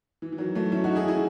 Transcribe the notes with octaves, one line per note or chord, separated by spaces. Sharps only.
E3
E3
D#3 F#3
F#3 A3
C#4 E4
D#4 F#4
E4 G#4
E4 G#4